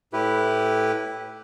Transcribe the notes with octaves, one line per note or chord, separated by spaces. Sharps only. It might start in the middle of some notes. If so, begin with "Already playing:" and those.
A2 E4 G4 B4